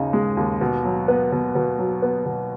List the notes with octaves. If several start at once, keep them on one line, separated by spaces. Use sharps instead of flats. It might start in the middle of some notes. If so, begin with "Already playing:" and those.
Already playing: D#2 C#3 D#4
G#3
D#2
B2
F#3
B3
B2
B2
F#3
B3
B2